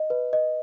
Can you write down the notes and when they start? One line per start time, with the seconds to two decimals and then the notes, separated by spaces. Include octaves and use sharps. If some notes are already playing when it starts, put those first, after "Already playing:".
Already playing: D#5
0.10 B4
0.33 D#5